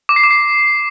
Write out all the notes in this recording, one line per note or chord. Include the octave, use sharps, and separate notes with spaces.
D6
C7
D6
C7